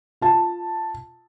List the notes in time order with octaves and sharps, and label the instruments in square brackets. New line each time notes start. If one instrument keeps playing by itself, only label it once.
[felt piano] F4 A5